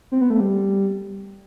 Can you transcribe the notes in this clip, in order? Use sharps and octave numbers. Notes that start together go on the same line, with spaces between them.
C4
B3
A3
G3